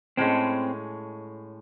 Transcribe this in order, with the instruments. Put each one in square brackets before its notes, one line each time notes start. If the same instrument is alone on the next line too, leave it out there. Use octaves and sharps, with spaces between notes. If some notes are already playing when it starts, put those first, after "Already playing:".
[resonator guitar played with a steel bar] A2 G#3 C#4 [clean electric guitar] C4